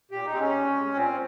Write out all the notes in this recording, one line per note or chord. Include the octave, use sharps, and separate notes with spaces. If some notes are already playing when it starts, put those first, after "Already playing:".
A#2 G4
D#4
G#3 C4
C#4
A#2
G#3
A#2 C4